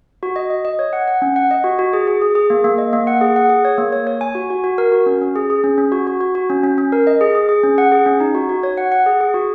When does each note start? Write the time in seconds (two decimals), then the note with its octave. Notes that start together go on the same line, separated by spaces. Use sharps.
0.23 F#4
0.36 D#5
0.50 D#5
0.65 D#5
0.79 C#5
0.93 F#5
1.08 F#5
1.22 C#4
1.36 F#5
1.51 D#5
1.64 F#4
1.79 F#4
1.93 G#4
2.07 G#4
2.22 G#4
2.35 G#4
2.50 A#3
2.64 A#3
2.78 D#5
2.93 A#3
3.07 F#5
3.21 G#4
3.36 F#5
3.49 G#4
3.65 C#5
3.78 A#3
3.93 C#5
4.07 C#5
4.21 G#5
4.35 F#4
4.50 F#4
4.64 F#4
4.78 A#4
4.92 F#4
5.06 C#4
5.21 C#4
5.36 G#4
5.50 G#4
5.64 C#4
5.78 C#4
5.92 F#4
6.07 F#4
6.20 F#4
6.35 F#4
6.50 C#4
6.64 C#4
6.78 C#4
6.92 A#4
7.07 D#5
7.21 G#4
7.35 G#4
7.49 G#4
7.63 C#4
7.78 F#5
7.92 G#4
8.06 C#4
8.20 D#4
8.35 F#4
8.49 F#4
8.63 C#5
8.77 F#5
8.92 F#5
9.06 G#4
9.21 G#4
9.34 F#4